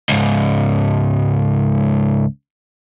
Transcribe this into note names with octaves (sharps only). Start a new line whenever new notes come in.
C#2 G#2